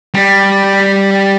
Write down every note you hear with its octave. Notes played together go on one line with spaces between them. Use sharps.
G3